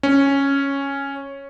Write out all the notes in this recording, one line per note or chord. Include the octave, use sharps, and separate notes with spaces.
C#4